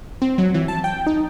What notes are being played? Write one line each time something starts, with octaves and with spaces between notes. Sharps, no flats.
C4
F#3
E3
A5
G5
D#4